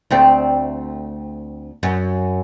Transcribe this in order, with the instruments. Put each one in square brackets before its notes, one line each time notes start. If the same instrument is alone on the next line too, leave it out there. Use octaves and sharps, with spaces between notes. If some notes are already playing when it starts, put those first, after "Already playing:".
[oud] D2 A3 C4
F#2